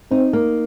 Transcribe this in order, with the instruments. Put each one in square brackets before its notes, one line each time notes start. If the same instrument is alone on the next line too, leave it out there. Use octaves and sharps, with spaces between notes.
[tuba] C4 [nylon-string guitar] D#4
[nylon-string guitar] A#3